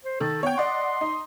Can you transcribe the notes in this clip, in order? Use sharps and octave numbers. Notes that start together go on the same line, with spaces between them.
C5
D#3 A4
B3 C#5 G5
D5 D#5 F#5 C6
D#4